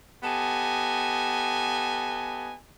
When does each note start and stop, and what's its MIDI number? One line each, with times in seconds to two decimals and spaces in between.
0.23 2.54 59
0.23 2.54 67
0.23 2.54 69
0.23 2.54 75
0.23 2.54 80